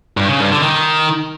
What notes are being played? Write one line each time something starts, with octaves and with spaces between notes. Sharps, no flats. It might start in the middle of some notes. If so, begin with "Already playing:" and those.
G2
C#3
G2
D3
D#3